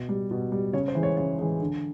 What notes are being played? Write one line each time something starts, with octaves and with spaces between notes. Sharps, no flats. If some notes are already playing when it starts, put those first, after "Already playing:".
Already playing: B2
G3
B2
G3
C#3 C#5
C5
E3 G#3
C#5
C#3 C#5
E3 G#3
D3